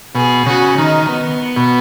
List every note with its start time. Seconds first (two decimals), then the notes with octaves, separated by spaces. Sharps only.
0.15 B2 G#4
0.46 C#3 F#4
0.78 D#3 D#4
1.10 B3
1.56 B2